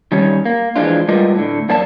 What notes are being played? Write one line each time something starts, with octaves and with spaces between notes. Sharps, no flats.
D#3 G3 C#4
A#3
E3 F3 G#3 D4 F4
G3 G#3 F4 A#4 B4 D#5
A2 D3
F#2 A#3 D5 A5